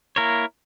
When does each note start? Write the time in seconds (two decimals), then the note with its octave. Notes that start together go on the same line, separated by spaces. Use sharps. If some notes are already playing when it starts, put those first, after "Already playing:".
0.16 A#3 E4 A#4 C#5